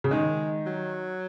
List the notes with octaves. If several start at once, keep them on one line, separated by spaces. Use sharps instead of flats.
C#3
D#3 G#3
F#3